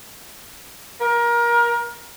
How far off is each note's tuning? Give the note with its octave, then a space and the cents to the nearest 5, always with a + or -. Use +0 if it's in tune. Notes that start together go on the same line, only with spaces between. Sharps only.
A#4 +25